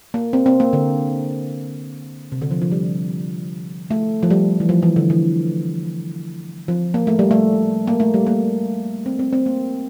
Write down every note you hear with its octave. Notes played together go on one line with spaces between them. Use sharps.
A#3
C4
C4
A#3
D3
C3
D3
F3
F3
G3
A3
F3
G3
E3
F3
E3
D3
E3
F3
A#3
A3
G3
A3
A#3
A3
G3
A#3
C4
C4
C4
A#3